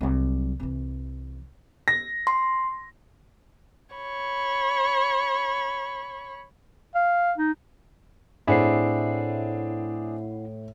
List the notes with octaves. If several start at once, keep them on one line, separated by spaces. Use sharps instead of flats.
C2 F#3
C2 E3
A#6
C6
C#5 B5
F5
D#4
A2 C4 D4 E4 G#4 F#5 C7